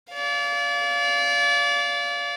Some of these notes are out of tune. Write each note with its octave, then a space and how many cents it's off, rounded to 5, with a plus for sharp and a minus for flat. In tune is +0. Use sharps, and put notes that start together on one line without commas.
D5 -35 F5 +0